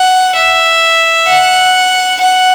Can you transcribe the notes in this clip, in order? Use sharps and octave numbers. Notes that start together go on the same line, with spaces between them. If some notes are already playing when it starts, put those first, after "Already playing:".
Already playing: F#5
E5
F#5
F#5